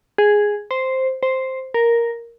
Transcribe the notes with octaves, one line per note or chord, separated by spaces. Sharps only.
G#4
C5
C5
A#4